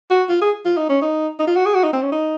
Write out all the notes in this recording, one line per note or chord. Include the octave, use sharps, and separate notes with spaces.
F#4
F4
G#4
F4
D#4
C#4
D#4
D#4
F4
F#4
G#4
F#4
D#4
C4
C#4
D#4